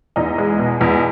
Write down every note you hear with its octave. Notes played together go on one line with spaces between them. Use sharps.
E2 D#4
G#3
B2
E2